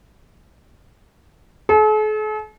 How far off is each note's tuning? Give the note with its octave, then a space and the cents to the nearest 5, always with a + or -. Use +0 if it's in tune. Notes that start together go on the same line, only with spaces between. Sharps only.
A4 -45